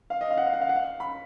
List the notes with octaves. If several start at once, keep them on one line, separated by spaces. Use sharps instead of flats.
F5
D#5
F5
F#5
F5
F#5
F5
F#5
F5
B5